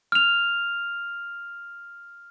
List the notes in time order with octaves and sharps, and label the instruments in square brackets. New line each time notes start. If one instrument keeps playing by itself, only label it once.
[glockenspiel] F6 F7